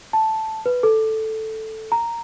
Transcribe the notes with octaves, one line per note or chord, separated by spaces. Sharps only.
A5
B4
A4
A#5